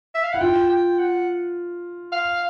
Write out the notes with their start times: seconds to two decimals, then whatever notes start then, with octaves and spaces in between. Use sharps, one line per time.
0.15 E5
0.23 F5
0.33 E4 F#5
0.41 F4 G5
0.70 G5
0.99 F#5
2.12 F5